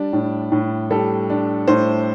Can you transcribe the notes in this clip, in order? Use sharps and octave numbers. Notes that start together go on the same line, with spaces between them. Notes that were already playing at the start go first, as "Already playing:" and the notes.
Already playing: G3 D4
A2
A2
G3 A4
D4
A2 C5